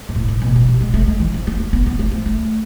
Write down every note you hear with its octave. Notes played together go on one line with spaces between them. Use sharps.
G#2
A2
A2
B2
B2
C3
G#3
A3
G#3
E3
F3
B3
A3
B3
B3
A3
F3
A3